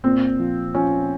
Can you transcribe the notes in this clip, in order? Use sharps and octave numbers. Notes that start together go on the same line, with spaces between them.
A#2 C4
F3
F3 C#4